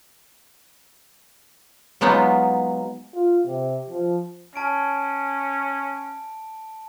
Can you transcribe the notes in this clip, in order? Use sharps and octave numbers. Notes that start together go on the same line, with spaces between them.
F#3 G#3 B3 D#4 F4
F4
C3
F3
C#4 A5 D7